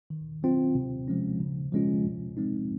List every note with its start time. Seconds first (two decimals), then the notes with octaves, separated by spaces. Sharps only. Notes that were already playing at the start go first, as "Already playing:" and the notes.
0.10 D#3
0.43 F#3 C4 F4
0.75 C3
1.08 F3 G#3 C#4
1.40 C#3
1.72 F3 G#3 C#4 F4
2.05 C3
2.37 F3 G#3 C4 D#4